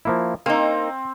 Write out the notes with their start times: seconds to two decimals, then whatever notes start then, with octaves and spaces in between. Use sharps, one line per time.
0.05 F3 A#3 E4
0.46 A#3 C4 D#4 F5